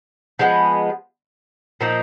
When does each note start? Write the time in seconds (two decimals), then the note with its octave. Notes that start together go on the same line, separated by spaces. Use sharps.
0.39 F3 G#3 B3
1.81 A#2 F3 A#3 D#4